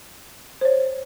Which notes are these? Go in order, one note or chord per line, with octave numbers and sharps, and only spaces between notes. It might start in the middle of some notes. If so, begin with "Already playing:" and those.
C5
C#5